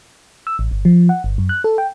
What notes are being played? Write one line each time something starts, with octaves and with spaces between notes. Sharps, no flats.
E6
A1
G1
F3
F#5
G1
F#2
F#6
A4
G5